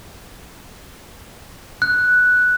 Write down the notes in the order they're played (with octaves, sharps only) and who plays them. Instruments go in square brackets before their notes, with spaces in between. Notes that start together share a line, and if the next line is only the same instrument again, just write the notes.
[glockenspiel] F#6